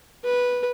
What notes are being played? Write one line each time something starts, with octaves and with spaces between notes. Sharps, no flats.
B4